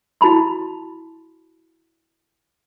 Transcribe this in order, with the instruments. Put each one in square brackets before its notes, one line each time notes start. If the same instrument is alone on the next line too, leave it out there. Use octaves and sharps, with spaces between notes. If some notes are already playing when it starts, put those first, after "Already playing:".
[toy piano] E4 F#4 A5 B5 C6